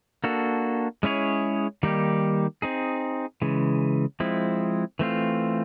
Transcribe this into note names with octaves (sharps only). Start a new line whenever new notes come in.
A#3 D4 F#4 A4
G#3 C#4 E4 G#4 C#5
D#3 G3 A#3 D#4 G4
C4 D#4 G#4
C#3 E3 G#3
F3 G#3 C4 E4
E3 A3 C4 F4